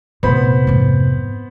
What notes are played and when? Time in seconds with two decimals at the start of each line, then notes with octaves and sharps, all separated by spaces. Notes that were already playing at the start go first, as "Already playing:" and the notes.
0.23 F1 A#2 B3 C5 B5
0.67 G#2 C4